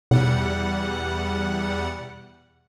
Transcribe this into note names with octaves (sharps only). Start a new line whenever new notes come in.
E2 B2 G3 F#5